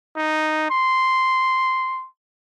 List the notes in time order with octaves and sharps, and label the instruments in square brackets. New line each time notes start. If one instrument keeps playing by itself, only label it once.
[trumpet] D#4
C6